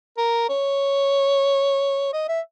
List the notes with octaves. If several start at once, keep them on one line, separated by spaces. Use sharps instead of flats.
A#4
C#5
D#5
E5